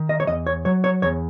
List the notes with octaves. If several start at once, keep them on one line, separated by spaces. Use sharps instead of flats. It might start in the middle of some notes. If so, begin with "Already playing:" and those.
Already playing: D#3
D#5
C#5
E2 D#5
C#5
F#3 C#5
C#5
E2 C#5